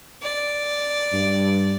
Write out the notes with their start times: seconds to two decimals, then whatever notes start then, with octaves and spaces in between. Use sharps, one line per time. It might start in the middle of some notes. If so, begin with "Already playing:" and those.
0.23 D5
1.13 G2